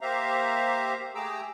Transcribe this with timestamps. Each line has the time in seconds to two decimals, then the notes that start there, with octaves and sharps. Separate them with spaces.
0.01 A#3 G4 C5 E5 F5 A#5
1.15 A3 G4 G#4 A#5 D6 E6